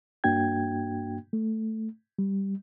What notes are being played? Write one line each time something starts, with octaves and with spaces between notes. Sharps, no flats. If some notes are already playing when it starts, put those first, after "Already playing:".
G2 A#3 D4 F#4 G5 G#6
A3
G3